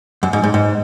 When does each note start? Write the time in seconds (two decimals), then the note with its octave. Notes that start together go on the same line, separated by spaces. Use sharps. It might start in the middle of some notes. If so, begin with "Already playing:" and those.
0.23 F#2
0.33 G#2
0.44 G#2
0.54 G#2